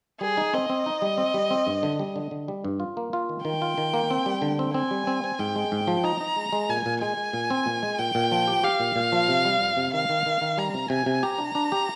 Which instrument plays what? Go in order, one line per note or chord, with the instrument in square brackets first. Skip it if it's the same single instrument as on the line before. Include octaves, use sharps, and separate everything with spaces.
[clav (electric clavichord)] G3 [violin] G#4
[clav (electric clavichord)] D#4
[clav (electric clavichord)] C4 [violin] D#5
[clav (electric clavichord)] C4
D#4
G3
C4
G3
C4
G2
D3
G3
D3
D3
G3
G2
F4
A#3
F4
D#3
[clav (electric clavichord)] D#3 [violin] G5
[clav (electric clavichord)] F4
D#3
A#3
C4
G3
D3
C4
[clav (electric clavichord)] C4 [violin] G#5
[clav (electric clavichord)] G3
C4
C4
[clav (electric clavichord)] G#2 [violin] G5
[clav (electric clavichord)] G#3
G#2
F3
[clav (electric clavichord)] D#4 [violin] A#5
[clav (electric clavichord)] D#4
G#3
G#3
[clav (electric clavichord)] A#2 [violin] G#5
[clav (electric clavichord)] A#2
[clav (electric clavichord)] G#3 [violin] G#5
[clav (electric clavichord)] G#3
A#2
C4
A#2
G#3
[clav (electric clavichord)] A#2 [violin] G5
[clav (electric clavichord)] A#2
F3
G4
[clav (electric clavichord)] G4 [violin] F5
[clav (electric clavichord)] A#2
A#2
F3
C3
G3
F2
C3
[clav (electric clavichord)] D#3 [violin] F5
[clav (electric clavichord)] D#3
D#3
D#3
[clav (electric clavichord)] G3 [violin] A#5
[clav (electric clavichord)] C3
[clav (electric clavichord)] C3 [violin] G#5
[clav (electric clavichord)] C3
[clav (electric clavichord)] G4 [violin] A#5
[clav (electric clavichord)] D4
D4
G4